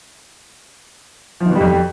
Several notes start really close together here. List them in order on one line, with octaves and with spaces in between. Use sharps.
F3 D#3 B2 G3 F2